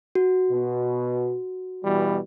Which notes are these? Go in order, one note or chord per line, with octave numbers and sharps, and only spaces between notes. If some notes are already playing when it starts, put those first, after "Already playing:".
F#4
B2
B2 E3 G3